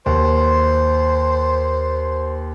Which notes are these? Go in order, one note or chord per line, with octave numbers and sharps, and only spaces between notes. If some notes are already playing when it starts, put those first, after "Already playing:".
D#2 C5